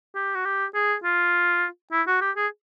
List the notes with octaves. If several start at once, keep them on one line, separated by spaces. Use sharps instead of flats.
G4
F#4
G4
G#4
F4
E4
F#4
G4
G#4